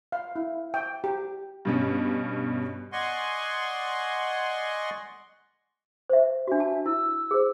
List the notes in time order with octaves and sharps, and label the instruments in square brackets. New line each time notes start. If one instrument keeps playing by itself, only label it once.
[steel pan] F5
E4
G5
G4
[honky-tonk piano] G2 B2 C#4
[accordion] D5 D#5 F#5 G#5 C6 C#6
[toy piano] C5 E5
[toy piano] D4 F#4 [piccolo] E5
[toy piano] A5
[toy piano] E4 [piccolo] E6
[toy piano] G#4 C5